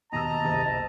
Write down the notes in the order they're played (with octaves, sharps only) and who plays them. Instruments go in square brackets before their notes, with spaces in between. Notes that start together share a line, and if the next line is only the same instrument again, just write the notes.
[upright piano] D#2 B2 E6 [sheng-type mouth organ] D#5 A#5 [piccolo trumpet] A5
[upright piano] F#1 C2